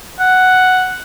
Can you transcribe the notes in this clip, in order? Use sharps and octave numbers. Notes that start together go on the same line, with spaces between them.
F#5